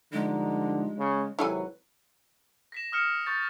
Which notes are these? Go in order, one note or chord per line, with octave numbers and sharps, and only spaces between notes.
G2 D3 F3 G#3 D#4
C#3
G#1 C3 F#3 E4 A4 B4 G#5
A#6 B6 E7
D#6 F6 C#7 E7
C#6 G6 A6